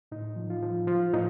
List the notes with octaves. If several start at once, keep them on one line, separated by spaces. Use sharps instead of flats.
A2 D#4
F3
F4
F3
F3 F4
A2 D#4